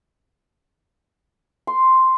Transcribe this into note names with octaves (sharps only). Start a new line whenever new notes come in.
C6